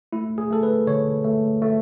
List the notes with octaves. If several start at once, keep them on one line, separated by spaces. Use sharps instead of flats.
A3 E4
G#4
A3 A4
B4
D3 C#5
A3
A3